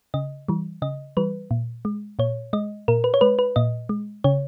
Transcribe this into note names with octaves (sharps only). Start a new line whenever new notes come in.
C#3 D#5
E3 G3
C#3 D#5
E3 G3 B4
A#2
G#3
A#2 C#5
G#3 D#5
A#2 A#4
B4
C#5
G#3 B4
B4
A#2 D#5
G#3
C#3 C#5